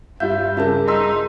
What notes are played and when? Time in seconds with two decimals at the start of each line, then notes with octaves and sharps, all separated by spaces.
0.20 G2 G3 F4 E5 G6
0.57 C#3 F4 G#4 A#4 A5
0.88 D#4 C6 E6 B6